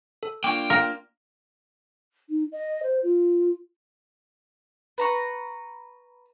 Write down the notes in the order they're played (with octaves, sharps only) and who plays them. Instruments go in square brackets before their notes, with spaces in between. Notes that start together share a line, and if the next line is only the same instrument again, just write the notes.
[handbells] A4
[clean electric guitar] A#3 D4 F4 [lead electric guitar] G5 [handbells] C#6 D6
[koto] A#4 [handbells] F5 A#5 C6
[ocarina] D#4
D#5
C5
F4
[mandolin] B4 A#5 C#6